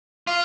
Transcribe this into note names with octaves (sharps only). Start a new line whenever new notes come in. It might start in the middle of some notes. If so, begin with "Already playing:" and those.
F4